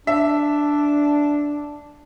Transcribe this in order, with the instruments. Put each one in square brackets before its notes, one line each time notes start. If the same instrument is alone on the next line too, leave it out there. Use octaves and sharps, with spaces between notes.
[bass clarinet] D4 [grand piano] E5